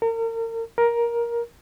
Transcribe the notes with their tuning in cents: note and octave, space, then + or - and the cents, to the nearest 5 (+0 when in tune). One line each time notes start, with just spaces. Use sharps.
A#4 -35
A#4 +15